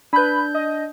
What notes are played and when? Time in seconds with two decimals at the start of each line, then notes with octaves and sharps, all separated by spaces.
0.13 D4 B4 B5 G6
0.54 D#5